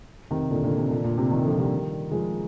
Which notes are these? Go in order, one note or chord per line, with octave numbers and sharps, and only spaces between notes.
C3 D#3
A#2 D3
A#2 D3
C3
A#2 D3
A#2
C3
C3 D#3
D3 F3
D#3 G3
F3 G#3